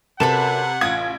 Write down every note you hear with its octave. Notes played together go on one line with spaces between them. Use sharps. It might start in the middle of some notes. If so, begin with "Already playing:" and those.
F#2 C3 A4 B4 F#5 B5 E7
A1 F4 D#6 G#6